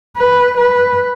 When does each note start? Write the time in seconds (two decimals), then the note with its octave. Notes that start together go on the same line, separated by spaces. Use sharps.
0.17 B4
0.57 B4